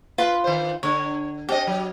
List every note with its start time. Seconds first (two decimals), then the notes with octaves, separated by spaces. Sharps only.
0.18 F4 B4 C6
0.44 D#3 C5
0.83 D3 C#5
1.49 C4 G4 D#5
1.67 F#3